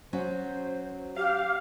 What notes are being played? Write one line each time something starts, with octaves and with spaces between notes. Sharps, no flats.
F#3 C#4 C5
G4 F5